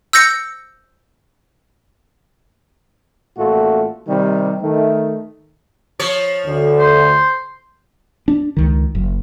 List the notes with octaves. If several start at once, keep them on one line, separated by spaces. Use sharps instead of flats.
E6 G6 A#6 C#7
A1 A#2 A3 F4 F#4
C3 D#3 G3
D#3 A3
F3 C#5
D2 D3
C5
D4
C#2 D#3
F#1